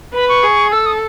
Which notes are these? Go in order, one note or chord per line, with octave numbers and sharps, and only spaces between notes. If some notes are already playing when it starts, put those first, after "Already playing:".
B4 B5
C#6
G#4
A4 E6
D#6